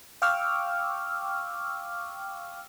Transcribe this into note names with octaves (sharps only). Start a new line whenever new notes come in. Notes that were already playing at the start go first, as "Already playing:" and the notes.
F5 G5 C#6 D6 E6 F6